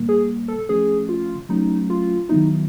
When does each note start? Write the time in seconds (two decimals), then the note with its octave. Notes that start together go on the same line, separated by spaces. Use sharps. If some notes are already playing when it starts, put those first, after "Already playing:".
Already playing: A#2 G3 A#3
0.09 G#4
0.48 A4
0.69 F3 A3 C#4 G#4
1.09 F4
1.49 F#3 A3 C#4 D#4
1.90 F4
2.29 D#3 F#3 B3 D#4 E4